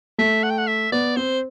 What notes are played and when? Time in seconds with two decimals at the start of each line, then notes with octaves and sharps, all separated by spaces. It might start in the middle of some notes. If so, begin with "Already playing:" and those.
0.18 A3 E5
0.43 F#5
0.50 G5
0.58 F#5
0.67 E5
0.92 B3 D5
1.16 C4 C5